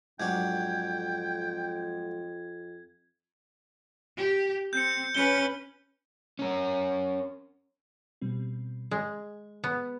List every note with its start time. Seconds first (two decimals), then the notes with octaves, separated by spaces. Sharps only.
0.20 F2 G#2 F#3 D4 G5 G#6
4.17 G4
4.73 C4 G6 C#7
5.15 C#4 B4 C#7 G7
6.39 C#4 A#4
8.21 B2 G3 C4
8.91 G#3 G#4
9.64 B3